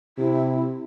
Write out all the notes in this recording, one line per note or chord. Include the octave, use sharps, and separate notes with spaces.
C3 E4